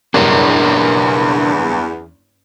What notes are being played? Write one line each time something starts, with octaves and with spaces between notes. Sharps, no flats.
F#1 E2 G2 D4 A#4